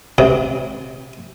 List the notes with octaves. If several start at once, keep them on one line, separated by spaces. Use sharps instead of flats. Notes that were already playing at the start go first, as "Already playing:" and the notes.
C#2 C3